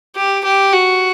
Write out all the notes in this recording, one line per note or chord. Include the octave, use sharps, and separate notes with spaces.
G4
G4
F#4